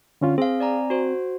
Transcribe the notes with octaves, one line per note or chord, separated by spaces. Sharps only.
D3 C#4 F4
C4 G#4 F5
D5 G#5 A#5
F#4 C5